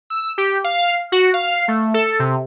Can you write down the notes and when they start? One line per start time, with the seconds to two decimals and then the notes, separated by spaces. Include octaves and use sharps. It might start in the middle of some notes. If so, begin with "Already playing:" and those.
0.10 E6
0.38 G4
0.64 F5
1.12 F#4
1.34 F5
1.68 A3
1.94 A4
2.19 C3